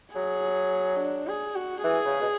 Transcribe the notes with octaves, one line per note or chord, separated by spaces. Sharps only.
F#3 G#4
D4
G#4
F#4
E3 G#4
C#3
B2